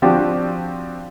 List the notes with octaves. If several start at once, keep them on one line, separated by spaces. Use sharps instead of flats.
F3 C4 D4 F#4 G4